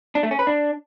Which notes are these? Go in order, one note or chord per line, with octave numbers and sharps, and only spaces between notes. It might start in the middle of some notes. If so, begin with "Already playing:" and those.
D4
A3
C#4
B4
D4